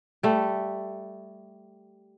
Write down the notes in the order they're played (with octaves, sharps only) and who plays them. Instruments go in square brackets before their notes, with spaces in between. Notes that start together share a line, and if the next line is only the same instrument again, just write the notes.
[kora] G3 A3